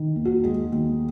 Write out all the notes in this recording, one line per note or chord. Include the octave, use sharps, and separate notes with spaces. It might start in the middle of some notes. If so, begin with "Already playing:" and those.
Already playing: D#3
D#2
F#4
G#3 G#4
D#2